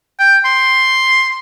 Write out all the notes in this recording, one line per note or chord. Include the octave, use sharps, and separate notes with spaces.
G5
C6